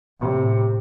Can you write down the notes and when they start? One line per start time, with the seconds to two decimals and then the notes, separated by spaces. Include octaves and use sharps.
0.19 A2 C3